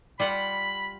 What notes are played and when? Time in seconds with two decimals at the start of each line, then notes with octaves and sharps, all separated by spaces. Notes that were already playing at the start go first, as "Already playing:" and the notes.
0.20 G3 F4 F#5 B5